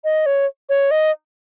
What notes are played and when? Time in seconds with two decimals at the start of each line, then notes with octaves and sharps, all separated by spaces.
0.04 D#5
0.26 C#5
0.69 C#5
0.91 D#5